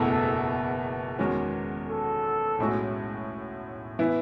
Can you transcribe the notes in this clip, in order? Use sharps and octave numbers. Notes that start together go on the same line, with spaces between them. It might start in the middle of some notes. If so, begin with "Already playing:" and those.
Already playing: F#1 E2 B2 A3 E4 A4
E2 D#3 G#3 C#4 F#4
A4
B1 A2 G#3 C#4 F#4
E3 B3 E4